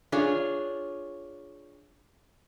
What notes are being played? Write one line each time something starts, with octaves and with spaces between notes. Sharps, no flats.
D4 F4 G#4 C#5